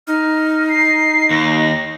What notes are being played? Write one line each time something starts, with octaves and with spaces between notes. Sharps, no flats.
D#4 F6
C7
D#2 A#6